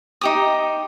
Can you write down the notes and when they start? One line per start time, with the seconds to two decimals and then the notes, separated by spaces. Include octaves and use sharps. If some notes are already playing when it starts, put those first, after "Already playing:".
0.21 D#4 G4 D#6